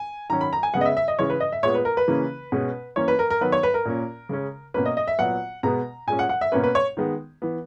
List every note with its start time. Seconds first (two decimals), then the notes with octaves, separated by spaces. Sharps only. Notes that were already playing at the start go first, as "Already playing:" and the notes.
Already playing: G#5
0.30 D#3 F#3 C#4 A#5
0.41 B5
0.53 A#5
0.63 G#5
0.74 C#3 G#3 B3 F#5
0.81 D#5
0.85 E5
0.97 E5
1.08 D#5
1.19 C#3 E3 G#3 C#4 C#5
1.30 B4
1.40 D#5
1.52 E5
1.63 A#2 G#3 B3 C#5
1.74 B4
1.85 A#4
1.97 B4
2.08 C#3 E3 A#3 C#4
2.52 B2 G#3 C#4
2.96 E3 A#3 C#4 C#5
3.08 B4
3.19 A#4
3.30 A#4
3.41 D#3 F#3 B3 B4
3.52 C#5
3.63 B4
3.74 A#4
3.85 A#2 A#3 C#4
4.29 C#3 G#3 C#4
4.74 B2 A#3 C#4 B4
4.86 D#5
4.97 D#5
5.07 E5
5.19 A#2 F#3 B3 F#5
5.63 B2 G#3 B3 A#5
6.07 A#2 G#3 C#4 G#5
6.19 F#5
6.29 F#5
6.41 E5
6.52 B2 A#3 C#4 B4
6.64 B4
6.75 C#5
6.97 D#3 G#3 B3
7.42 E3 B3